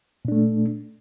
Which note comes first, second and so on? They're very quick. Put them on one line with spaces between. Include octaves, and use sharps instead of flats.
A#2 D4 A3